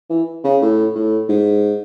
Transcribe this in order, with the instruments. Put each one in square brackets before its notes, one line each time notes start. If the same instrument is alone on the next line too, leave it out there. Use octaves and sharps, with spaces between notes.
[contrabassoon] E3
C#3
A2
A2
G#2